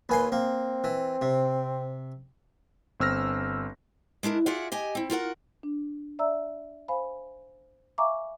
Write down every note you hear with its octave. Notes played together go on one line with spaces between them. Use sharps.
D#2 B4 G#5 C6
A#3 C4
E3
C3
G1 C4 E6 F6 A#6
G#3 D4 E4 A#4
F4 F#4 G#4 D5 E5 F#5
G4 D#5 G#5
C4 E4
F4 F#4 A#4 F#5
D4
D5 E5 A#5 E6
C5 F5 G#5 B5
E5 F5 G#5 A#5 C#6 D6